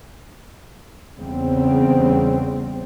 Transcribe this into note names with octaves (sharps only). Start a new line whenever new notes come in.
E2 C#3 G3 C4